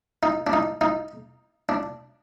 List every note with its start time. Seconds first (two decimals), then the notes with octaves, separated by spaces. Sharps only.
0.23 D#4
0.47 D4
0.53 D#4
0.81 D#4
1.69 D4